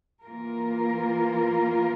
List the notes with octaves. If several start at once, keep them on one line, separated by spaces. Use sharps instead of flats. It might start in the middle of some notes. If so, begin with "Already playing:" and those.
E3 A#3 F4 A#4